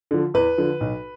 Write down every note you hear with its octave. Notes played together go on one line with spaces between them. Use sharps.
D3 F3
E2 B4
D3 F3
B1